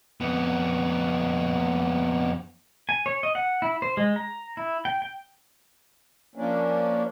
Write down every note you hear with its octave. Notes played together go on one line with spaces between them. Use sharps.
F2 B3
G#5
C#5
D#5
F#5
E4
C5
G#3
A#5
E4
G5
G5
F3 A#3 C#4 D4